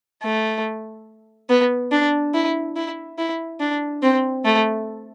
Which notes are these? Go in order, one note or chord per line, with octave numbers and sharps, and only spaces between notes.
A3
B3
D4
E4
E4
E4
D4
C4
A3